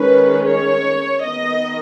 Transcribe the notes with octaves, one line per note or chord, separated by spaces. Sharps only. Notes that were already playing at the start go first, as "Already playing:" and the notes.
Already playing: D#3 G#3 C#4 B4
C#5
D#3 B3 D#5